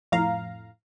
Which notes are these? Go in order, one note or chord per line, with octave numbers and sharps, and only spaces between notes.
F2 A2 F5 A#5